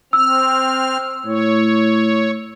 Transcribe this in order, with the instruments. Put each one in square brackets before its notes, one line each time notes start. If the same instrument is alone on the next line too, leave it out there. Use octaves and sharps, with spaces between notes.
[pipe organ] C4 F6 [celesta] E6
[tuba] A2 [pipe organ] C#5